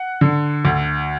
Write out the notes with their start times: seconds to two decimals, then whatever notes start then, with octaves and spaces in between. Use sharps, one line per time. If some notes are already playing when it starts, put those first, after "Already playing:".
Already playing: F#5
0.21 D3
0.65 D2